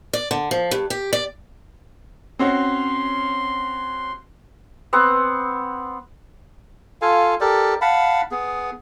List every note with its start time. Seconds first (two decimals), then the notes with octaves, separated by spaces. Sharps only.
0.13 D5
0.31 D3
0.51 F3
0.71 G2
0.90 G4
1.13 D5
2.39 C4 C#4 F#4 C6
4.93 B3 C4 F#5
7.02 F4 A4 F5 G#5
7.40 G4 A4 A#4 D5
7.81 F5 F#5 A5 B5
8.31 B3 G#4